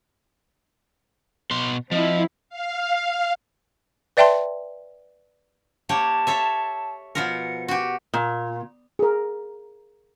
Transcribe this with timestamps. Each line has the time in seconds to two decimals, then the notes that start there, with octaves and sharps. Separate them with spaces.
1.51 B2 C6
1.91 F3 C4 E4 D#5
2.49 F5
4.17 B4 D5 E5 G5 A5 C6
5.89 A#3 G4 C#5 A5
6.27 A4 C#5 E5
7.15 B2 F3 A#4 C#7
7.68 F#4 G4
8.14 A#2
8.99 G#4 A#4